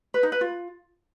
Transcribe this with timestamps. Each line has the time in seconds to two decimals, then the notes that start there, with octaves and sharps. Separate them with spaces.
0.14 B4
0.23 D#4
0.32 B4
0.41 F4